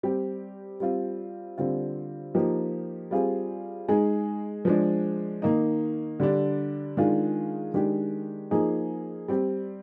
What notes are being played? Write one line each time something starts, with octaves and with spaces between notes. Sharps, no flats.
G3 C4 G4
G3 C4 F4
D3 G3 C4 F4
F3 A#3 D#4 G4
G3 C4 F4 G#4
G#3 D#4 G#4
F3 G#3 D4
D#3 A#3 D#4
D3 G3 D4
D#3 G#3 D4 F4 G#4
D#3 G#3 D4 G4
F3 A#3 D#4 G#4
G3 C4 G4